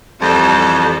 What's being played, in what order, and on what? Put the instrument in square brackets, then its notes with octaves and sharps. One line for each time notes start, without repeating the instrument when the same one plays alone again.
[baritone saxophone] F2 [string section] E3 G3 A4